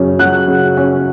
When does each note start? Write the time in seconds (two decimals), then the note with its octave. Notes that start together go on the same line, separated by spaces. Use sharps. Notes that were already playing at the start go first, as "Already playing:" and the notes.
Already playing: F#2 C#3 C#4
0.19 F#3 F#6
0.48 C#3
0.77 C#4